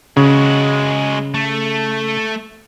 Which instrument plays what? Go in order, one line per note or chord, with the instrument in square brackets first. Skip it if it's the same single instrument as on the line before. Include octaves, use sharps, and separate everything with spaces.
[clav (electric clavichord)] C#3 [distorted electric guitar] G#3 F#4
[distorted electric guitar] A3